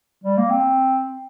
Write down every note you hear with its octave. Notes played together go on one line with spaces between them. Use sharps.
G3
A#3
C4